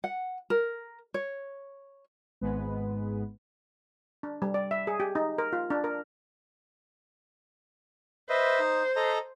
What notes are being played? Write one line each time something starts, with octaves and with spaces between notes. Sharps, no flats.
F#5
A#4
C#5
G#1 G#2 G#3 B3 B4
D4
G3
D5
E5
G#4
G4
D#4
A#4
F4
D4
A#4
B4 C5 D#5 E5
D#4
A4 D#5 A#5